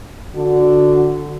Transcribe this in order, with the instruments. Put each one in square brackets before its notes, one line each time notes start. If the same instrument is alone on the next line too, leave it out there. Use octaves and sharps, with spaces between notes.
[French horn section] D3 F#4